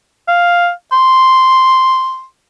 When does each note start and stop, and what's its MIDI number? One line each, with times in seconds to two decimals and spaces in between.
0.28 0.70 77
0.92 2.24 84